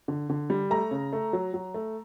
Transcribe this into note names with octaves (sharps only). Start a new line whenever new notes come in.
D3
D3
G3
A3 A#5
C#3
A3
F#3
F#3
A3